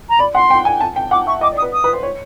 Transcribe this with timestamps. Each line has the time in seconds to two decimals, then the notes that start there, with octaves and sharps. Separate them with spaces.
0.09 A#5
0.19 D5 B5
0.35 F#5 C6
0.50 G5
0.65 G#5
0.80 A5
0.96 G5
1.11 F#5 D6
1.27 E5 C#6
1.41 D#5 D6
1.52 D5
1.57 D#6
1.62 B4
1.73 D#6
1.84 B4
1.93 C5
2.03 C#5